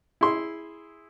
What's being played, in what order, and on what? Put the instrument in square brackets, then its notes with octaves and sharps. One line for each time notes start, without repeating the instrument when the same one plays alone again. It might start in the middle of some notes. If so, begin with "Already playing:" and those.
[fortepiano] E4 G#4 C6